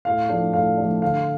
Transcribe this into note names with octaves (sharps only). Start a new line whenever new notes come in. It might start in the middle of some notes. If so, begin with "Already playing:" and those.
A2 F5
F3 A3 D4
A2 F5
F3 A3 D4
D3 F5